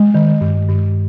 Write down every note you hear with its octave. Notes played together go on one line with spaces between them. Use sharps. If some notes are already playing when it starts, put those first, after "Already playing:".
Already playing: G#3
D#3
G2
G2